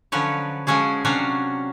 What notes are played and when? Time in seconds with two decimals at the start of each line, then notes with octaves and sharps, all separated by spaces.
0.12 D3 F3 F#3 C#4 B4 C#5
0.67 F3 G#3 C#4 F#4 G#4
1.05 C3 F#3 C#4 D4 F#4 F5